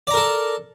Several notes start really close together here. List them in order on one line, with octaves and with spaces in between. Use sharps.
D5 A#5 A#4 A4